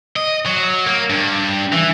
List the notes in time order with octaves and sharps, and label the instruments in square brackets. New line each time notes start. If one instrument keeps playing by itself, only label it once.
[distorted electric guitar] D#5
F#3
A#3
G2
E3